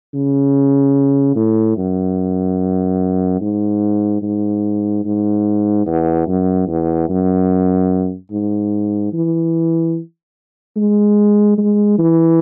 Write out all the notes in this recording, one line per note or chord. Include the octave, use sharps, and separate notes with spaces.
C#3
A2
F#2
G#2
G#2
G#2
E2
F#2
E2
F#2
G#2
E3
G#3
G#3
E3